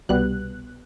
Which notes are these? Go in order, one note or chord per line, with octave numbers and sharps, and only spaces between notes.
C2 B2 G3 B3 F#6